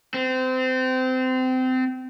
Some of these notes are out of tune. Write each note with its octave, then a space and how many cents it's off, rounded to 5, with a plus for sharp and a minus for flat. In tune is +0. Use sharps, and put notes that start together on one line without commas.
C4 -25